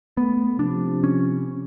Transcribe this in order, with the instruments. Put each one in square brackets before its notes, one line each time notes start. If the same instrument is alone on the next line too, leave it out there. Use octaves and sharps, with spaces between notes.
[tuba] A3 [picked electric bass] B3
[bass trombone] C3 [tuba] F3 [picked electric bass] D4
[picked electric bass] C#4